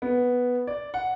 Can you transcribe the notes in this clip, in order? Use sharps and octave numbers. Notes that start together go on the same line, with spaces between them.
B3
D5
F#5